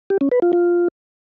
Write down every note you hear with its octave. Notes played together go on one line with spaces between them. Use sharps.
G4
C#4
B4
F4
F4